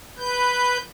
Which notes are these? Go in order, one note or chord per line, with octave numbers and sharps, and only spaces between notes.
B4 G6